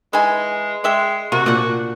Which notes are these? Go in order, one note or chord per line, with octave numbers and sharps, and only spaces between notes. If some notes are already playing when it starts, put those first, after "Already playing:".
E3 G#3 D#4 G#5
G#3 D5 E5 G5
C3 F#4 A#4
A#2 D4 F#5